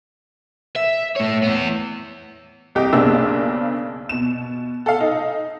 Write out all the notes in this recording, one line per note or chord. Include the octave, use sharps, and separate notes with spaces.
E5
A3 C#5
B3 E4
C2 G4 D#5 G5
B1 C#3 A#3 C4 D4 E6
B2 E7
A4 F5
D#4